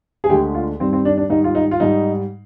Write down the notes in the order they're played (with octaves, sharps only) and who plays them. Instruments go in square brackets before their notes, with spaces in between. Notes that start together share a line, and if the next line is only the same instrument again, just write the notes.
[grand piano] G#4
D2 D3 G#3 G4
F4
G2 D#3 G3 C4
C4
D4
D4
G#2 D#3 G3 D#4
F4
D#4
F4
G#2 G3 D#4